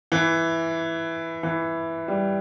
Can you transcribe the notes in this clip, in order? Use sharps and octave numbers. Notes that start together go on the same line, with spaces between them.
E3
E3
G3